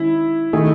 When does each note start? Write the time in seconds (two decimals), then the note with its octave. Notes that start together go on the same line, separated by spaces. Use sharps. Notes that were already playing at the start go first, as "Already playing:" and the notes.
Already playing: D#3 G#3 C#4 E4 G#4
0.53 D#3 A3 D#4 G#4